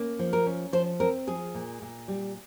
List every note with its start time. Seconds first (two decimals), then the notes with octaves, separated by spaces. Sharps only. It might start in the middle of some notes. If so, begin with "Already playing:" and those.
Already playing: A#3 C#4
0.19 F3
0.33 A#4
0.46 C#4
0.73 F3 C5
1.00 C4 A#4
1.27 F3 G#4
1.54 A#2
1.82 A#2
2.08 G3